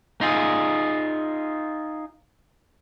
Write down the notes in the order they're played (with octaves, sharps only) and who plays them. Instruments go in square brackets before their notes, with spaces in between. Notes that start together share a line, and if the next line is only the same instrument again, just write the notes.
[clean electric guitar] D#4 F4 G#4